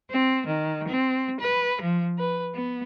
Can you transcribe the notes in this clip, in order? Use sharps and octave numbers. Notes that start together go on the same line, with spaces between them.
C4
D#3
C4
B4
F3
B4
B3